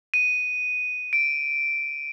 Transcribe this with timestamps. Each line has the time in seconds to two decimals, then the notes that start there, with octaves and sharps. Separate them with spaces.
0.14 D#7
1.13 D7